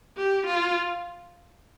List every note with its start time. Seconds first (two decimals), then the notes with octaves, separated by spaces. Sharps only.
0.18 G4
0.47 F4